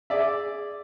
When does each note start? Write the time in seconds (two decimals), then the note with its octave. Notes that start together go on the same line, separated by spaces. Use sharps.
0.10 G#4 D5 E5